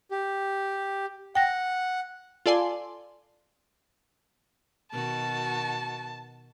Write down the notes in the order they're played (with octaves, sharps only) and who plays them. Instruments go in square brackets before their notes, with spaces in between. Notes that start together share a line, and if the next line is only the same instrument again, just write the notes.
[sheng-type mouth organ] G4
[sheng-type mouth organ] F#5 [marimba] G5 A#6
[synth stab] F4 A4 D5 G#5 C6
[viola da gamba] B2 D#3 F#4 [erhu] A5